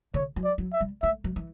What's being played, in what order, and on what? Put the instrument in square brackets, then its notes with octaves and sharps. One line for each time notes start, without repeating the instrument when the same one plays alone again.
[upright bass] D3 [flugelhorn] C#5
[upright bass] F#3
[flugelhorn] D5
[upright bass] F#3
[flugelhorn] E5
[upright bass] G3
[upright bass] A3 [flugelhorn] E5
[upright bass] F#3
E3